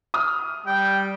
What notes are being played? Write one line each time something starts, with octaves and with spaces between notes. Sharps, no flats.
D#6 F6
G3 G5